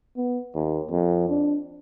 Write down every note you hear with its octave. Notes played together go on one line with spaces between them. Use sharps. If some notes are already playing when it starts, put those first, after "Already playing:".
B3
D#2
F2
D4